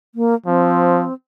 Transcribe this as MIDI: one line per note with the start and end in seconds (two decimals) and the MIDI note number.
0.15 0.34 58
0.46 1.07 53
0.46 1.13 60